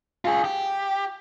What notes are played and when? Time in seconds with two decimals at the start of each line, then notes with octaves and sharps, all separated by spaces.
0.25 F4 G#4
0.44 G4